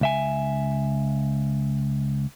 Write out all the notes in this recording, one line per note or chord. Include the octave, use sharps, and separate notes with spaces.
C#2 E5 G#5